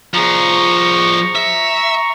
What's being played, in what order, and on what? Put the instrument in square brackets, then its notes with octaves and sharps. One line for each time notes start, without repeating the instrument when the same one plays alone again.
[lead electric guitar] F3 G#4 [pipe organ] A#5 C#6
[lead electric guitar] E5